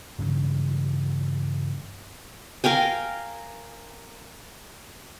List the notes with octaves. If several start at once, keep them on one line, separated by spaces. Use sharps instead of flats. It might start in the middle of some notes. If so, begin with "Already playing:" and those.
G2 C#3 E3 F#3
A#4 F5 G5 G#5